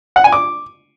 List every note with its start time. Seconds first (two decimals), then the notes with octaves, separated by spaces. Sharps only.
0.16 F#5
0.24 G#5
0.32 D6